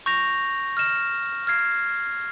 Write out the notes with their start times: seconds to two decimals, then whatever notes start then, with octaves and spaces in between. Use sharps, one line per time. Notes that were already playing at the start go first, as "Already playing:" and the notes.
0.06 C#6 G6 A#6 F7
0.77 F6 A#6 E7
1.47 F6 G#6 C7